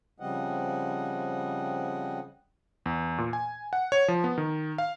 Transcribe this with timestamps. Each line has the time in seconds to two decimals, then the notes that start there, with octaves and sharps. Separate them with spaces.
0.20 C#3 F3 G3 C4 D#5 F#5
2.86 E2
3.18 A#2
3.33 G#5
3.73 F#5
3.92 C#5
4.08 F3
4.24 B3
4.38 D#3
4.78 F5